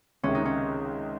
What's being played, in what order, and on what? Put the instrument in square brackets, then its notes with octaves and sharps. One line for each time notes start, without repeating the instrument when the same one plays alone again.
[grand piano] C#2 C3 D#3 [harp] C#4
[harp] D#4
C#4